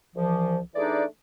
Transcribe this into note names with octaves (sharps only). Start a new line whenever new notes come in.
C2 E3 F3
E3 A3 D4 D#4 G#4 D5